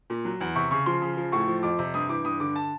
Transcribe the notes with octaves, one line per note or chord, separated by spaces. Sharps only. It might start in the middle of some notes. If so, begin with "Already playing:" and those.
A#2
F#3
E2
C3 C#6
C#3 C#6
F3 C6
C#3
F3
A2 C#6
F3
F2 D6
C3
G2 D#6
E3 D6
G2 D#6
D3 D6
A5